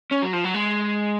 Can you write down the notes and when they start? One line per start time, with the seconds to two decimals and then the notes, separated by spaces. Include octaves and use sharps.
0.11 C#4
0.22 F#3
0.33 F3
0.44 F#3
0.54 G#3